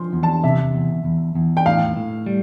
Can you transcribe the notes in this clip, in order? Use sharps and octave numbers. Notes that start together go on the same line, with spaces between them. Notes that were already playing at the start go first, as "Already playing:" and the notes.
Already playing: F3 C6
E2
A5
C3 E5
E2
E2
E2
G5
A2 F5
A2
G3